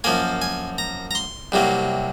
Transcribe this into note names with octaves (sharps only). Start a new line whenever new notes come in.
F#2 F3 A#3 G#5
G#5
A#5
A#5
C6
C2 C3 F#3 A#3